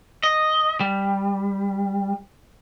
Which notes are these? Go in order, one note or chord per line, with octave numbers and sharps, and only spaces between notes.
D#5
G3